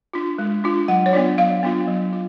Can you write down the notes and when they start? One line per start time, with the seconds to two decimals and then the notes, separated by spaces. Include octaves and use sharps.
0.14 D4 F4
0.38 G#3
0.64 D4 F4
0.88 F#3 F#5
1.06 C#5
1.13 B3 D4 F4 D5
1.38 F#3 F5
1.63 B3 D4 F4
1.88 F#3
2.13 F4